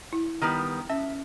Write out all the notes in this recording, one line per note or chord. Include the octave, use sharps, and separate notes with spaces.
E4
D#3 G3 B3
C#4 E5